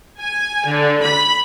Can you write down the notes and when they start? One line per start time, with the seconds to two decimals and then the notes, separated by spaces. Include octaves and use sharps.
0.18 G#5
0.68 D3
1.02 B5